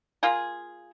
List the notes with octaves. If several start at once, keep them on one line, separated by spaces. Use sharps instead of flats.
A#3 F4 G#4